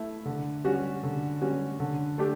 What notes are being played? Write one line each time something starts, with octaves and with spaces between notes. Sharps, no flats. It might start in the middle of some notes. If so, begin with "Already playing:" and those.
Already playing: A3 E4
D3
G3 C#4 F#4
D3
G3 C#4 F#4
D3
A3 D4 G4